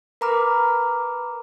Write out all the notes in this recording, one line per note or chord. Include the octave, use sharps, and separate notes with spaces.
A#4 B4 A#5 B5 D6 F6